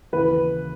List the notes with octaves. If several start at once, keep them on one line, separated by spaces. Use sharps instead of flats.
D#2 C#3 E3 B4